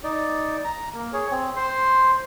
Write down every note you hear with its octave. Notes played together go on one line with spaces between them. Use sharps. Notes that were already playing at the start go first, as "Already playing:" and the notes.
D#4 D5
A#5
A#3
G#4 C#5
C4
C5 C6